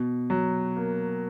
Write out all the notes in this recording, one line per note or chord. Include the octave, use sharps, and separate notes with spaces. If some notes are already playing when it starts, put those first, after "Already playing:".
Already playing: B2
F#3
A#3